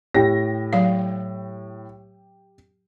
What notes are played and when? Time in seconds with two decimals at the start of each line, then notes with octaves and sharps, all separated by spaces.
0.15 A2 G4 A#6
0.73 F#3 F5